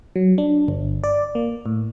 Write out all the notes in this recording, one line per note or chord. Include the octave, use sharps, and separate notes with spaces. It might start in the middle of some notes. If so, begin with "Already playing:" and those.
F#3
D4
G1
D5
A#3
A2